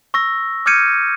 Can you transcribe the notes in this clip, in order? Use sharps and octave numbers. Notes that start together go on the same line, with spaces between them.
C#6 E6 A#6
D6 F6 G6 G#6 C#7 D#7